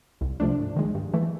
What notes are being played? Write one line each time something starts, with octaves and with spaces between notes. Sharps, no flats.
C2
C3 F3 A3 D4
G#2
D#3 G#3
G2
E3 A3